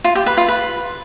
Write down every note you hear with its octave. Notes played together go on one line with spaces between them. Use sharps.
F4
G4
B4
F4
B4